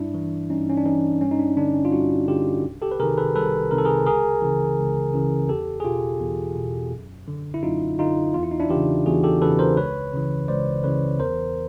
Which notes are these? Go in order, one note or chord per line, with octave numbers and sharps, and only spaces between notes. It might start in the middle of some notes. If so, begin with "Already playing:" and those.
Already playing: G2 D4 E4
E3
G2 C#4 D#4
C#4
D4
E3 C#4 D#4
G2 C#4
D#4
D4
D3 D4
C#4
F4
G2 E4 F#4
D3 F4 G4
C2
G4 A4
B4
C3 D#3 G#4 A#4
A4 B4
C2 A4 B4
C3 D#3 A#4
A4
G#4 A#4
C#2 G#4 A#4
C#3 E3
C#2
C#3 E3
E2 G4 A4
G#4
B2 F4 G4
E2
B2
F#2
D3
E4
F#2 D#4 F4
D3 D#4 F4
E2 F4
E4
D#4
D4 E4
C#3 E3 F4 G4
E2 F#4 G#4
G4 A4
C#3 E3 A4 B4
A#4 C5
C#2 B4 C#5
C#3 E3
C#2 C5 D5
C#3 E3 B4 C#5
E2 A#4 C5